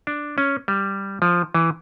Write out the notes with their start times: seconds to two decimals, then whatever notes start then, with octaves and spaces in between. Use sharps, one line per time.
0.07 D4
0.38 C#4
0.68 G3
1.22 F3
1.54 E3